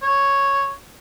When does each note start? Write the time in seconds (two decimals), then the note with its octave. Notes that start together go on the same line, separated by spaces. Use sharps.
0.02 C#5